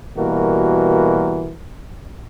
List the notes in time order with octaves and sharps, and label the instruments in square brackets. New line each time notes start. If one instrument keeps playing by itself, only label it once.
[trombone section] B2 E3 G3 A#3 F#4 A#4